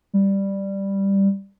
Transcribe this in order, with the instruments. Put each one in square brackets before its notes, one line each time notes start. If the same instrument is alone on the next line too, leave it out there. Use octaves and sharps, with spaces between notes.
[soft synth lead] G3